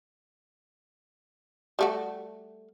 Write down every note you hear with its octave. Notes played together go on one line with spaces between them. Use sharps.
G3 A3 F#4